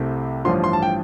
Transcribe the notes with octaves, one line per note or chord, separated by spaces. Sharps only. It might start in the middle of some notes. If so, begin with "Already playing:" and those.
Already playing: C2 C3 A3 C4
A1 G2 F3 D4 C6
C6
A5
G5